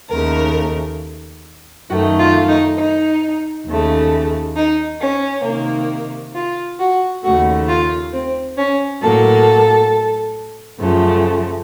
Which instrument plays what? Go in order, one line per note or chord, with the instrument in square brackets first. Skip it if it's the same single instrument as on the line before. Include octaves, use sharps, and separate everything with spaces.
[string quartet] D#2 C#3 A3 A#4
F#2 D#3 A3 F#4
F4
D#4
D#4
D#2 C#3 A3
D#4
C#4
C3 D#3 A#3
F4
F#4
D#2 C#3 A3 F#4
F4
C4
C#4
A2 F#3 A#3 A4
F#2 C#3 F3 A3